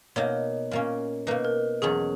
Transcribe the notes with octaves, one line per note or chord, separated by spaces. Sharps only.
B2 A#3 D#4 C#5
A#2 A#3 C#4
B2 A#3 D#4 B4
A#4
E2 B2 F#3 C#4 G#4